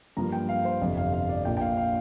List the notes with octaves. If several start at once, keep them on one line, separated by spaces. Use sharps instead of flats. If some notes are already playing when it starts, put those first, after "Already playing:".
G2 F3 A#3 A#5
G5
F5
C5
G1 F2 C3
F5
F5
D5
A#1 A#2 A#3 G5
G5
F5
F5